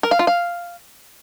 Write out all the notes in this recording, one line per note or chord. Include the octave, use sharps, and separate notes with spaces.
A#4
F5
F4
F5